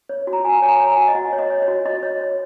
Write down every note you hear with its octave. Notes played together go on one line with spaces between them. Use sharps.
C#5
F#4
A#5
F#4 G#5
C#5 G#5
A#5
C#5
G#5
F#4
D#5
F#4 F#5
C#5
D#5
C#5
C#5
F#4
F#4 D#5
C#5
C#5